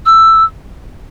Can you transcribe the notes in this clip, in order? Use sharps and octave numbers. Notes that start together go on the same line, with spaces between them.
E6